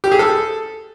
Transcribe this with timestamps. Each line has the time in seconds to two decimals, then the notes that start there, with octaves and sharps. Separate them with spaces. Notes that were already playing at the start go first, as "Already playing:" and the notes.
0.04 G4
0.11 G#4
0.19 A4